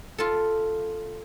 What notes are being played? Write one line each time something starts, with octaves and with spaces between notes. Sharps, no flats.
F4 A4